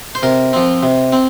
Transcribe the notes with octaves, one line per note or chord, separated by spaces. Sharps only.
C5
C3 A#4
F3 C4
C3
C4